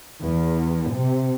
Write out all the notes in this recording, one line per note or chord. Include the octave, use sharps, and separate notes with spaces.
E2
C3